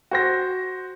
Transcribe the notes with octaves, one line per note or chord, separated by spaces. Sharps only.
F#4 C5 A#6